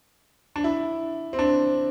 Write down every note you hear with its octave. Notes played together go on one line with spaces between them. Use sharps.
D4
E4
C4
D4